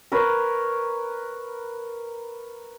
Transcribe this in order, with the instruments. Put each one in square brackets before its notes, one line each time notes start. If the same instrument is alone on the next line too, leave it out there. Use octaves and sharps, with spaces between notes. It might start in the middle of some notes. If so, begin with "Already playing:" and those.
[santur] A#4 B4 C#5